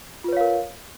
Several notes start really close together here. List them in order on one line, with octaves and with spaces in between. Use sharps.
F4 B4 C#5 F5 A#4